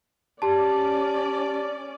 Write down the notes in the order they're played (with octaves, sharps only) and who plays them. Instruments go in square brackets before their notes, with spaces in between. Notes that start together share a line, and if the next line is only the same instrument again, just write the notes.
[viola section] C#4 D5 [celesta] G4 A5